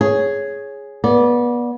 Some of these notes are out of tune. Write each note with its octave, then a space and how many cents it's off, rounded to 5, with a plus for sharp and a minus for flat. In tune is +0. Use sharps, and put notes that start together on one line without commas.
G#4 +0 C#5 +0
B3 -30 D5 -10